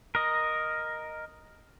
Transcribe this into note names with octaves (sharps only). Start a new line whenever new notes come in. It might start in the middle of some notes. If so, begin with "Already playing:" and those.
A#4 D#5